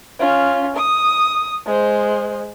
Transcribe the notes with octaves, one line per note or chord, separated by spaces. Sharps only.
C#4 F4
D#6
G#3 C5